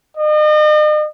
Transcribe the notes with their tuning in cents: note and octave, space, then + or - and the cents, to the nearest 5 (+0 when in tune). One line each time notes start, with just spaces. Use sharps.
D#5 -40